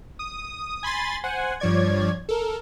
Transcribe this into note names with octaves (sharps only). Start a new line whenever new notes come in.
D#6
G#5 B5 C6 A6
C5 F#5 G#5
G2 F3 C#5 D5 G#6
A4 A#4